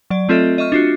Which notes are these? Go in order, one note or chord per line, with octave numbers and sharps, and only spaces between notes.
F#3 D5
A3 C4 F4 A4 D#5 E5
D#5 E5 C#6 F6
D4 F4 F#4